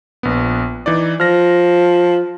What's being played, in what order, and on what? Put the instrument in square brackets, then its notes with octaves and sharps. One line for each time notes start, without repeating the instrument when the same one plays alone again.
[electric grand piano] A#1 B3
E3 D#4 D5
[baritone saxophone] F3 [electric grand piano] F6 A#6